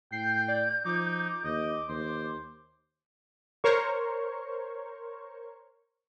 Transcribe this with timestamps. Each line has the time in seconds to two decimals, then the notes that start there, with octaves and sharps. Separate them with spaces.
0.12 A2 G5 G6 C7
0.48 D5
0.85 F3 D#4 D6
1.45 D#2 D#5
1.89 D#2 C5
3.64 A#4 C5 C#5 C#6